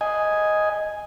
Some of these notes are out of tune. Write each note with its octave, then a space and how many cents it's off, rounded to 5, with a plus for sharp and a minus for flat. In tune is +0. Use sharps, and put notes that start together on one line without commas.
D#5 +0 G#5 +0